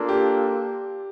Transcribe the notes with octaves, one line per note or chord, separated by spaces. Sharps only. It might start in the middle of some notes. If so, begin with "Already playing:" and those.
Already playing: A#3 D4 F4 A4
G4